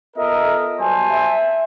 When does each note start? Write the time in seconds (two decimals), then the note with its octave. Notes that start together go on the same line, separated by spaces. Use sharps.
0.17 B3 F4 A4 A#4 D#5 E5
0.80 F#3 G3 B3 C5 G#5 A5
1.11 E5